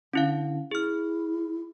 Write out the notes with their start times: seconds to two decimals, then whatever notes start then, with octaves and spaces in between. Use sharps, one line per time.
0.13 D3 C#4 E4 F5
0.71 E4 G#4 F6